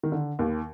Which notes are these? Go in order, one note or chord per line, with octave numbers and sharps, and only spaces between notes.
D#3
D3
D#2 D#3